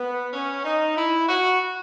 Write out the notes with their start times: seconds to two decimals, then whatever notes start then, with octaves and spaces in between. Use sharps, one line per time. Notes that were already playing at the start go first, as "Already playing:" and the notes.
Already playing: B3
0.33 C#4
0.65 D#4
0.96 E4
1.28 F#4